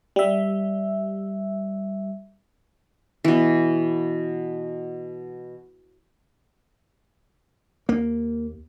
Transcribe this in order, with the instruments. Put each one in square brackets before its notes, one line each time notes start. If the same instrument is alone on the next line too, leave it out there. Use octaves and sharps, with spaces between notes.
[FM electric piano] G3 E5
[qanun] B2 E3
[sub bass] D#2 [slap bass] A#3